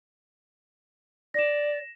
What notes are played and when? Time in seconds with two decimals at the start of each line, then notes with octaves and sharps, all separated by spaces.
1.34 D5 A#6 E7